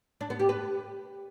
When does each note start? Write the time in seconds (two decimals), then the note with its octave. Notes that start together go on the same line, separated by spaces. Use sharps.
0.21 D4
0.30 B3
0.39 G4
0.49 B4